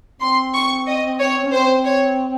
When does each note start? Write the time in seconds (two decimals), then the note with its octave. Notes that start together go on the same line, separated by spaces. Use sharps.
0.21 C4 C6
0.54 C#6
0.87 D#5
1.20 C#5
1.46 C#4
1.52 C4 C5
1.85 C#5